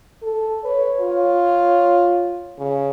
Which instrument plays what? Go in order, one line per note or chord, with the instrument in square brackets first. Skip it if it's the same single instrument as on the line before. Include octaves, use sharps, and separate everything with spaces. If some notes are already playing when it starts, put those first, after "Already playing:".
[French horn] A4
[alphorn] B4 [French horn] C#5
[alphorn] F4
C#3